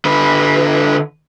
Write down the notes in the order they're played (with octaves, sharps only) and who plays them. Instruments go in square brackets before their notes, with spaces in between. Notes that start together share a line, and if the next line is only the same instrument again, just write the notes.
[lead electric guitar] D3 B4